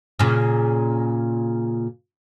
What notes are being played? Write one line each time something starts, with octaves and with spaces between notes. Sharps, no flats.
A#2 C#3